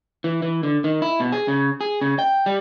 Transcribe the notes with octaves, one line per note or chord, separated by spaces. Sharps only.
E3
E3
D3
D#3
E4
B2
G#4
C#3
G#4
C#3
G5
G3